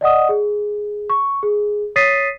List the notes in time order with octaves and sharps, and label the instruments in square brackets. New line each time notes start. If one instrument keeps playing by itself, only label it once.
[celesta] D5 D#5 F#5 D#6
G#4
C#6
G#4
C#5 D#6 A6 B6 C7 D#7